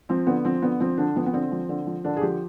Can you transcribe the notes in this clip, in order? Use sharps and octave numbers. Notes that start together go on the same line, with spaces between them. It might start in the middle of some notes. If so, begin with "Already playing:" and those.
F3 C4
D3 B3
F3 C4
D3 B3
F3 C4
D3 D4
F3 B3
B3
D3 C4
F3
D3
F3
D3 D4
G#4
F3 G4